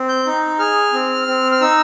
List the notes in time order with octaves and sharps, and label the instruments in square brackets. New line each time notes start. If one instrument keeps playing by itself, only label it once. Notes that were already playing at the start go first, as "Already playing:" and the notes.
Already playing: [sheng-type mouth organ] C4
G6
D#4
G#4 F6
C4
C4
F6
D#4 E6